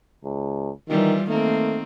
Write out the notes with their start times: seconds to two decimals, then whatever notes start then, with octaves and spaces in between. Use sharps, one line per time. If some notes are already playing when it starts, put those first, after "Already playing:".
0.25 C#2
0.89 D#3 E3 G3 F4
1.28 D#3 A3 A#3 C4